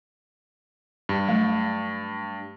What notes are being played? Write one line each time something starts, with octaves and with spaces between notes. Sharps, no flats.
G2
F#3 A3 F5